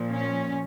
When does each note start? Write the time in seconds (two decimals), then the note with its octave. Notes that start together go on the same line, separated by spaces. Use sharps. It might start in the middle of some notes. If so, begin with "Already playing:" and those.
Already playing: A#2 F3
0.13 C#4